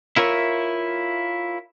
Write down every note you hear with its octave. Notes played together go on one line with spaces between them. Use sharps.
E4 F4 A#4 C#5 E5